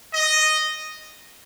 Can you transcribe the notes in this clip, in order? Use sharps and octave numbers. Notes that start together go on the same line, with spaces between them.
D#5